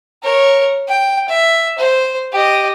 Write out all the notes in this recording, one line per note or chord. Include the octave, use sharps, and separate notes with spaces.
A#4 C#5
G5
E5
C5
G4 D#5